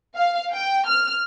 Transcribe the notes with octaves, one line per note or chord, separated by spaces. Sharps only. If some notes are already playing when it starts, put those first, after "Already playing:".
F5
G5
F6